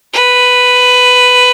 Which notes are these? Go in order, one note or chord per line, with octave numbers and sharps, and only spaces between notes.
B4